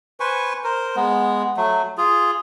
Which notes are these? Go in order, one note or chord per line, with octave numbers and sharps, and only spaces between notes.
B4 C5 G#5 C#6
A#4 C5
G#3 B3
F#3 A3
F4 G#4